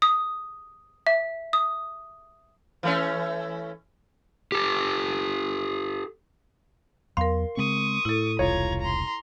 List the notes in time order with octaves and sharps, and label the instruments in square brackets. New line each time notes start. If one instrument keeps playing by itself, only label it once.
[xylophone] D#6
E5
D#6
[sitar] E3 A3 C#4
[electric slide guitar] G4 A4
[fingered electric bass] E2 F#3 [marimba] A#4 F5 [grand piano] C6
[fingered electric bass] C#3 G#3 C4 [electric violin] C#6 D#6
[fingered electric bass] A2 [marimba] E4 A4
[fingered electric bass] E1 C2 [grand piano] F4 C#5 [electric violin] A#5 G#6
[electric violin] A#5 C6